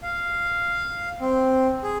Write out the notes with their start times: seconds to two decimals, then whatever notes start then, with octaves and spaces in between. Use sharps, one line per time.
0.03 F5
1.20 C4
1.83 G#4